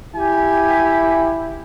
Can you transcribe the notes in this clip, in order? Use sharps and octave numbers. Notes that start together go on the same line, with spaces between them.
E4 G4 G#5